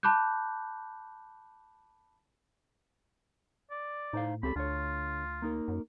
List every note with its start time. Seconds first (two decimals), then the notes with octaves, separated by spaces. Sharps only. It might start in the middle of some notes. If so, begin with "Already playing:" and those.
0.03 A5 B5 D6 F#6 G6
3.71 D5
4.13 A2 D#4 C5 F5
4.43 C#2 C4 G4 A4 B5
4.56 D2 D3 F4 C#5
5.42 A#3 D#4 A#4
5.68 F#2